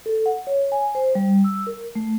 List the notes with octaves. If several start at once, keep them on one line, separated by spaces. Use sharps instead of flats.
A4
F#5
C#5
G#5
C5
G3
E6
A#4
A3